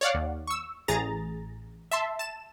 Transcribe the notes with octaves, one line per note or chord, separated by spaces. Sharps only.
C#5 D5 F5 F#5
D#2
C#6 E6
A1 G#4 A#5 A6
E5 A5 C6
A5 E7